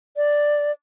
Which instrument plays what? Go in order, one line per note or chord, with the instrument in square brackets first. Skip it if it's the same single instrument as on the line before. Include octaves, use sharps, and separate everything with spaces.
[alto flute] D5